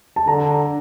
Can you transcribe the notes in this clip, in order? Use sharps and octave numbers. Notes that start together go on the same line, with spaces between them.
A5
D3 A#5